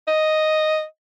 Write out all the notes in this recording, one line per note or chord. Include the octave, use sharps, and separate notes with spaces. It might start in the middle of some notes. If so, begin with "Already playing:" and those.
D#5